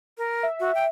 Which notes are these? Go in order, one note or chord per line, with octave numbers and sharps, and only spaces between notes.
A#4
E5
F#4
G5